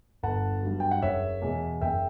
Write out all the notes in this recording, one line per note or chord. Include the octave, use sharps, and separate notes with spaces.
G1 F#5 A5
G2 F#3
G5
F#5
F#1 C#5 E5
E2 B2
F#1 E5 G5